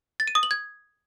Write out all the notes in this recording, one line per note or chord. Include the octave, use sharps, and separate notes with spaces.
A6
D#7
D#6
F#7
G#6